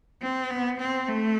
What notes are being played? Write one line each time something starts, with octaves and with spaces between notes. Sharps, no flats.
C4
B3
C4
A3